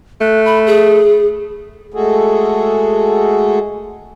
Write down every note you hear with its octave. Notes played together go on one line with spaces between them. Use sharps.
A3 F#6
B5
G#4
G#3 A3 F#4 G#4 A4